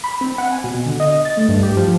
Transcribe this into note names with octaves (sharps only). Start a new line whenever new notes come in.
B5
C4
F#5
G#5
B2
D3
D#5
A6
A3
G2
G4
F3